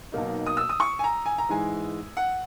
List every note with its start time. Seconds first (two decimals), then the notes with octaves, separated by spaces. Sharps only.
0.12 B1 B2 A#3 D#4
0.47 D#6
0.57 E6
0.69 D#6
0.80 C#6
0.99 G#5
1.04 A#5
1.26 G#5
1.38 A#5
1.49 G#2 E3 G#3 G#5
2.17 F#5